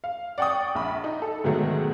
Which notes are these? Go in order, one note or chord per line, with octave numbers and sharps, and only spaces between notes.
F5
D5 F#5 G5 C#6 D#6
A#1 E5 B5
D#4
A4
G#2 B2 D#3 F#3 A3